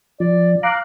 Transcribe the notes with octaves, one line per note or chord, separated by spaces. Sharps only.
F3 D5
F5 A#5 D6 F#6